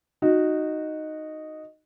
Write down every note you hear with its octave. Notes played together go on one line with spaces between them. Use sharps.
D#4 F#4